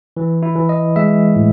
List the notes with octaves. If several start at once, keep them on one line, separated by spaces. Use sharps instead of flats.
E3
E4
E3
D#5
G#3 E5
A2